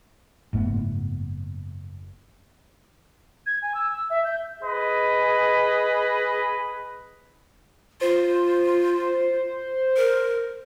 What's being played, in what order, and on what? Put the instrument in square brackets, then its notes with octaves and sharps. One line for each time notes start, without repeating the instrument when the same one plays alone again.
[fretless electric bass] F#1 G#2 A3 B3
[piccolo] G#6
G#5
E6
E6
E5
G6
[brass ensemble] G#4 B4 D#5
[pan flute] F4 [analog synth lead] C5
[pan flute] A#4